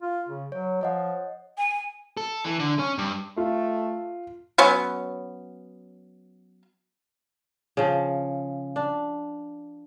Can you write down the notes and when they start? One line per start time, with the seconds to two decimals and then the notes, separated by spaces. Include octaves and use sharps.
0.02 F4
0.28 C#3
0.52 F#3 C#5
0.81 F3 C#5 D#5 F#5
1.58 G#5
2.17 A4
2.44 E3
2.59 D3
2.79 C#4
2.98 G2
3.37 A3 F4
4.58 F#3 B3 C#4
7.77 C#3 F3
8.76 D4